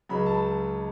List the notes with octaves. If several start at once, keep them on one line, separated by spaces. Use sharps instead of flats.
C#2 C#3 F#3 B5
A5